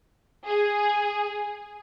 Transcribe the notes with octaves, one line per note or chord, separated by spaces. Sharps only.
G#4